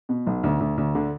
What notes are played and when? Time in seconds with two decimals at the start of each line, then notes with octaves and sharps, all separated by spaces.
0.09 B2
0.27 B1
0.43 D2
0.60 D2
0.78 D2
0.95 D3